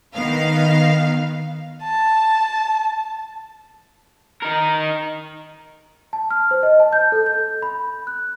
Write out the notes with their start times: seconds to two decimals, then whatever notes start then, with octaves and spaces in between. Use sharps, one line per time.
0.15 D#3 B3 F5
1.83 A5
4.42 D#4 A#4
6.13 A5
6.31 F6
6.51 C5
6.63 D#5
6.80 A5
6.93 G6
7.12 A4
7.26 G6
7.62 B5
8.07 F#6